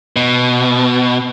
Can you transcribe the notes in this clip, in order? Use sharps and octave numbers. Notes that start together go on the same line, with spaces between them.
B2